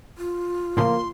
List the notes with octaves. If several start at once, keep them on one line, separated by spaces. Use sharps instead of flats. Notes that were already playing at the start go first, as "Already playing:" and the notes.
F4
A2 C#3 F3 A#3 C6